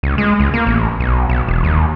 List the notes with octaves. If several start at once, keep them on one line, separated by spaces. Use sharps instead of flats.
C#2
G#3
C#2
A#3
A1
B1
B1
E1
D#2